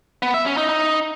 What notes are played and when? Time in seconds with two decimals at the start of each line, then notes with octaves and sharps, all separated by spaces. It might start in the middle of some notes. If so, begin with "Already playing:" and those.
0.22 B3
0.34 E5
0.46 C#4
0.57 D#4
0.69 D#4